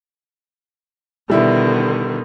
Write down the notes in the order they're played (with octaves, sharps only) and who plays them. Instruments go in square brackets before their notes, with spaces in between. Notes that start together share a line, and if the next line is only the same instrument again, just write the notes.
[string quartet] B2 D3 D#3 [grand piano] G3 E4